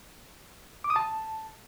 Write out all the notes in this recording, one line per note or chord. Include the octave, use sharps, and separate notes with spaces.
D6
D#6
A5